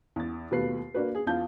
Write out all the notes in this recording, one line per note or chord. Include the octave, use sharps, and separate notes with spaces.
E2 A6
D#2 B2 A3 F4 B4 C7
A#3 D4 F#4 B4
G#4
E2 B3 F4 A5 G6